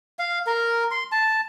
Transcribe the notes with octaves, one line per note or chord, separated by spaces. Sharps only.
F5
A#4
C6
A5